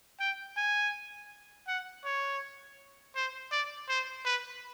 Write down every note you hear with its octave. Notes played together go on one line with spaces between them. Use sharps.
G5
G#5
F#5
C#5
C5
D5
C5
B4